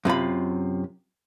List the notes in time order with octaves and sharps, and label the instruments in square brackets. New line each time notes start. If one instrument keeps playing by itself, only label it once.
[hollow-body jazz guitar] F#2 C3 F4 B5